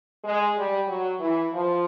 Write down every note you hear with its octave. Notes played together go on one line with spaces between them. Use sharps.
G#3
G3
F#3
E3
F3